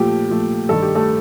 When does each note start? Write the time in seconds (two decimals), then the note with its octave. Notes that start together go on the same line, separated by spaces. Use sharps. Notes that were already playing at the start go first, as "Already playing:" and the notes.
Already playing: A#2 F3 A3 G4
0.30 A#2 F3 A3
0.69 G2 D#3 G3 A4
0.82 G4
0.95 A3 A4